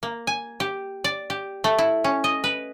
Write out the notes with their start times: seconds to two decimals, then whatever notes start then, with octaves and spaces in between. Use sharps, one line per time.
0.03 A#3
0.27 G#5
0.60 G4
1.04 D5
1.30 G4
1.64 A3
1.78 E4
2.04 C#4
2.24 D#5
2.44 B4